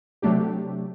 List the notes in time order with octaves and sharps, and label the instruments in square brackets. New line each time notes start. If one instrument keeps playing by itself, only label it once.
[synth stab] C3 F#3 A3 D4 G4